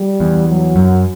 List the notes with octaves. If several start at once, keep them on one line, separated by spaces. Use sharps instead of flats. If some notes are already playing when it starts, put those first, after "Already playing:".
Already playing: G3
E2
F#3
F#2